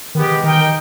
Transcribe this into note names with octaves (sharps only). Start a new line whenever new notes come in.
D#3 G#3 B3 G4
D#3 D#4 A#4 D#5 G5